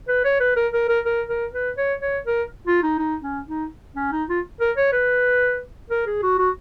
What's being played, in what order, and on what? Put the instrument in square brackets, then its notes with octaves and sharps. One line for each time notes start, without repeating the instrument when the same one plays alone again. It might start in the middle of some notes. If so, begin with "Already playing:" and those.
[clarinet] B4
C#5
B4
A#4
A#4
A#4
A#4
A#4
B4
C#5
C#5
A#4
F4
D#4
D#4
C#4
D#4
C#4
D#4
F4
A#4
C#5
B4
A#4
G#4
F#4
F#4